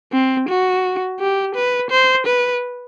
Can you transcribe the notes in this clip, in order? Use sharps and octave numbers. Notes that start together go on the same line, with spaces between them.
C4
F#4
G4
B4
C5
B4